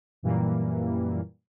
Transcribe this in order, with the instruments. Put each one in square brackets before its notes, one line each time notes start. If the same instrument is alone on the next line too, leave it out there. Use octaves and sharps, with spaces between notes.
[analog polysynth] F#2 A#2 E3 G3 A#3